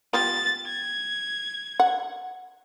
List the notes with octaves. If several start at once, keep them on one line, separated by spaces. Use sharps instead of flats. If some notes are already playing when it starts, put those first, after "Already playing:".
B3 F4 G4 A6
G#6
F#5